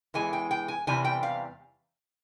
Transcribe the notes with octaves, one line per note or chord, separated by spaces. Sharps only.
E2 E3 G#3 G#5
G5
G5
G#5
E2 C3 E3 G3 G#5
G5
F5